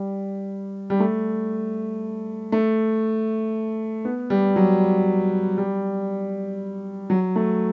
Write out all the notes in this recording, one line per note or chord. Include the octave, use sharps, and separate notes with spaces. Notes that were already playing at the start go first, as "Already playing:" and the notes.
Already playing: G3
G3
A3
A3
B3
G3
F#3
G3
F#3
A3